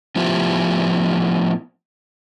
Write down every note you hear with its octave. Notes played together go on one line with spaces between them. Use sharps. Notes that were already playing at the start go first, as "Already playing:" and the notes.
A2 F3 B3 E4 F4 G4